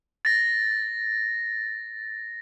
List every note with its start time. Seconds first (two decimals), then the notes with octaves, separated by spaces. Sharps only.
0.25 A6 A#6